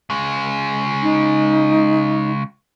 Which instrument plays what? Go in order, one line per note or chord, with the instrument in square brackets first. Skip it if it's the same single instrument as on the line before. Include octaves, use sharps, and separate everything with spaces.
[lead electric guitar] C#3 G#3
[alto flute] D#4